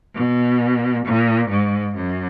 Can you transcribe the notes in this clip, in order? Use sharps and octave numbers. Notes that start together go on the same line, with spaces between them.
B2
A#2
G#2
F#2